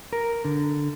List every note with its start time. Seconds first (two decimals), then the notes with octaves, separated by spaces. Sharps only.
0.13 A#4
0.45 D3